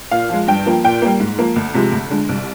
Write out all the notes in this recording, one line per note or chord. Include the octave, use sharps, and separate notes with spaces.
A#2 F5
F3 G#3
G2 G5
F3 A#3
A#2 G5
G3 A#3
G#2
F3 A#3
D2
C3 F3 G#3
D2
D3 G#3
C2